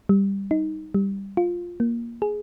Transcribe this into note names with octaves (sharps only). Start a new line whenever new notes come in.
G3
D#4
G3
F4
A#3
G#4